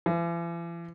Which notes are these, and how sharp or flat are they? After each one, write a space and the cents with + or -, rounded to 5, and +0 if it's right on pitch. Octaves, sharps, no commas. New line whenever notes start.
E3 +45